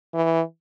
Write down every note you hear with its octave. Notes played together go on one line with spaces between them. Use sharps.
E3